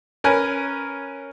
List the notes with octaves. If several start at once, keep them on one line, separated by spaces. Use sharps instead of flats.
C#4 A#4 B4 G#5